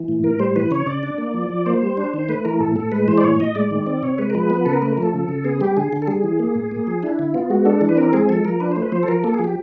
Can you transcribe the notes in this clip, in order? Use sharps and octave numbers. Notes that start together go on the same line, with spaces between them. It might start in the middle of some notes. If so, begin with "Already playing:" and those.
Already playing: E3
A2
A2 A#4
G3 C5
E3 B4
C#3 C#5
C#3 D5
D4
A#3
F3
F3
A#3 C5
G3
D4
D#3
A3 B4
E3 A#4
A2 A4
A2 A4
G#3 B4
E3 C5
D5
A2 C#5
A2 D#5
G#3 D5
D#3
C4 D5
C3 C#5
G#3 B4
A#4
F3 B4
B3
C#3 A4
A#4
A3 B4
A#4
F3 A4
C#3
C#3
B3 G#4
G3 G4
D3 G#4
D3
A4
G3 G#4
E3
A#3
A2
A#3
F3
D4 E4
D3
B3 F4
G#3 F#4
D4 A4
E3
B4
C4 A#4
G#3 G#4
F3 A4
F3 A#4
D4 B4
A3 C5
B4
F3 C5
A4
F3 A#4
A#3 A4
F3 G#4
G4